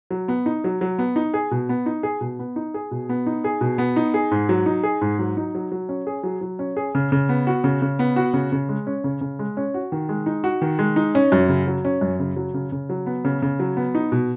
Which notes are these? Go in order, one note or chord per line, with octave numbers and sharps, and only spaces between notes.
F#3
B3
D#4
F#3
F#3
B3
D#4
G#4
B2
B3
D#4
G#4
B2
B3
D#4
G#4
B2
B3
D#4
G#4
B2
B3
D#4
G#4
G#2
F#3
D#4
G#4
G#2
F#3
D#4
F#3
F#3
C#4
G#4
F#3
F#3
C#4
G#4
C#3
C#3
B3
F#4
C#3
C#3
B3
F#4
C#3
C#3
G#3
C#4
C#3
C#3
G#3
C#4
F#4
D#3
G#3
D#4
F#4
D#3
G#3
D#4
C#4
F#2
C#3
F#3
C#4
F#2
C#3
F#3
C#3
C#3
F#3
B3
C#3
C#3
F#3
B3
D#4
B2